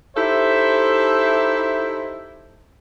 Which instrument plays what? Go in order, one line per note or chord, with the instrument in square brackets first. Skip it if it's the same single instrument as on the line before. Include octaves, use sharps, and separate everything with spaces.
[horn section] D#4 E4 G4 A4 C5 E5